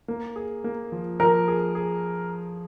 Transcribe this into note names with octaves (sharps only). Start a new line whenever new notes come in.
A#3
G#4
A#3
F3
F3 A#4
G#4
G#4